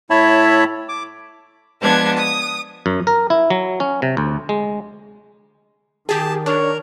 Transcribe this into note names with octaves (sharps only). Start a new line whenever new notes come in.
A2 E4 C#5 E5 A5 B5
D6
F3 G#3 B3 D4 A5 G#6
D#6
F#2
A#4
E4
F#3
C#4
C3
D2
G#3
D#3 G4 G#4 A5
D4 A#4 C#5